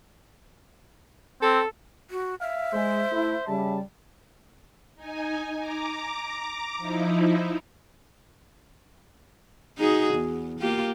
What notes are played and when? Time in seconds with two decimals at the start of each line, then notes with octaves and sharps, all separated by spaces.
1.42 C4 A4
2.11 F#4
2.41 E5 F5
2.73 G#3 C5
3.12 A3 E4
3.47 C#3 G3 A5
4.95 D#4 G#5
5.57 A#5 D6
6.77 F3 D#4 E4
9.78 D#4 F#4 G#4
10.14 E2
10.60 A#3 F4 G4